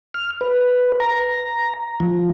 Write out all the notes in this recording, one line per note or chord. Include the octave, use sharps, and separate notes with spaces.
F6
B4
A#5
F3